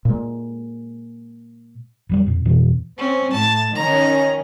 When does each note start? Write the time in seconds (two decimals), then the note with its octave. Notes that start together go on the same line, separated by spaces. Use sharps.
0.05 A#2 G#3
2.09 F1 F#3 G3
2.26 F2 A#2
2.45 F2 B2 E3
2.98 C4 C#4
3.32 A2 A5
3.75 D#3 C#4 A#5